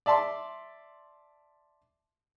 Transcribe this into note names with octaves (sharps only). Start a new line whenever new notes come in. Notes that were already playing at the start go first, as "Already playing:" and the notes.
D5 E5 A5 C6